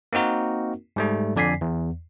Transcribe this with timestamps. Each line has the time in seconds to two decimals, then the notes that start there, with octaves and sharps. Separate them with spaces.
0.13 A#3 C4 D#4 F#4 A#4
0.96 G#2 G3 A3
1.36 F2 D3 D5 G#5 B6 C7
1.61 E2